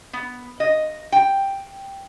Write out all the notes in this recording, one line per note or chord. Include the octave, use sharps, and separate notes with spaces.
B3
D#5
G5